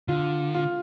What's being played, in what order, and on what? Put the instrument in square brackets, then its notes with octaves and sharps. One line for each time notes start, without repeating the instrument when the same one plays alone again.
[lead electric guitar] D3 [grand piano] F4
[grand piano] F4